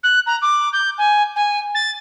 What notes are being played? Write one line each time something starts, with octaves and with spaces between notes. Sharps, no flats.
F#6
A#5
D6
G6
G#5
G#5
A6